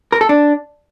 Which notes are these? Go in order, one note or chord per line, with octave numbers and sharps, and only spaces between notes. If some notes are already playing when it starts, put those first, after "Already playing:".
A#4
A4
D4